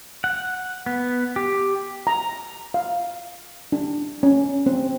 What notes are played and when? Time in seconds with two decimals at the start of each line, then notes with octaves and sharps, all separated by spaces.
0.24 F#5
0.86 B3
1.36 G4
2.07 A#5
2.74 F5
3.72 D4
4.23 C#4
4.66 C4